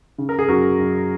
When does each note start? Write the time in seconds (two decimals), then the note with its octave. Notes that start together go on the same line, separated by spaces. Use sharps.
0.18 C#3
0.29 A#4
0.39 G#4
0.48 F#2 F#4 A#4
0.79 F#2